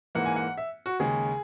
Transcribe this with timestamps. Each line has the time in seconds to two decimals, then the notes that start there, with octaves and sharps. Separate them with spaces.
0.15 G#2 E3 A#3 F#5
0.26 G#5
0.36 F#5
0.58 E5
0.86 F#4
1.00 D#2 C#3 G#3 G#4